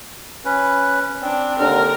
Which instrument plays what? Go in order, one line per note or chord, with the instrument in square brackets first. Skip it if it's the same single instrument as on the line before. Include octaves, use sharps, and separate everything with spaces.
[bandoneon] C#4 B4
[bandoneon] C4 [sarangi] D4
[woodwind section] D#2 D3 [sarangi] A#4